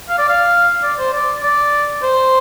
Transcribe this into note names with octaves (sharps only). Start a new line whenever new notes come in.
F5
D5
F5
D5
C5
D5
D5
C5